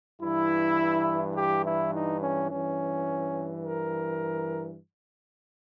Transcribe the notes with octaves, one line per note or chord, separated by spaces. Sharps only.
G2 E3 E4
G4
E4
D#4
C#4
G2 E3 C#4
A#4